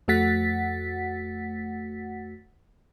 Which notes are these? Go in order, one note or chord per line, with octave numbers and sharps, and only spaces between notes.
F2 A3 F#4 F#5 A6 B6